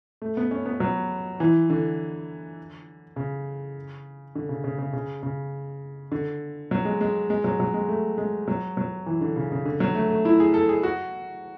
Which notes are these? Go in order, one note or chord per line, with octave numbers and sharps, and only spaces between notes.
A3
B3
C#4
B3
F#3
E3
D3
C#3
D3
C#3
C#3
C#3
C#3
C#3
D3
F#3
G#3
G#3
G#3
F#3
F#3
G#3
A3
G#3
F#3
F#3
E3
D3
C#3
C#3
D3
F#3
A3
A3
E4
G#4
A4
G#4
F#4